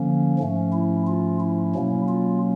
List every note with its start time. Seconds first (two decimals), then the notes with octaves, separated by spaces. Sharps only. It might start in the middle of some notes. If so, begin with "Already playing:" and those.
Already playing: D3 F3 A#3 C#4
0.39 G#2 F3 A3 C#4
0.73 E4
1.07 F4
1.41 E4
1.75 B2 F#3 A#3 C#4
2.09 F4